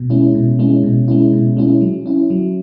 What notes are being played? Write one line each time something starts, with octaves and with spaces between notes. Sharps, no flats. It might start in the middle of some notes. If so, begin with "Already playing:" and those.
Already playing: B2
G#3 C#4 E4
B2
G#3 C#4 E4
B2
G#3 C#4 E4
B2
G#3 C#4 E4
F#3
C#4 E4
F#3